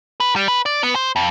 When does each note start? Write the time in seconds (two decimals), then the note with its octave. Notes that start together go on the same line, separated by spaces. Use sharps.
0.20 B4
0.36 G3
0.48 B4
0.66 D5
0.83 B3
0.95 C5
1.16 F2